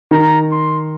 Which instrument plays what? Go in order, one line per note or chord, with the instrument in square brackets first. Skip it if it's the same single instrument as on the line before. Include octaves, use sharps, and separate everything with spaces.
[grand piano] D#3 [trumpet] A#5
[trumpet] C6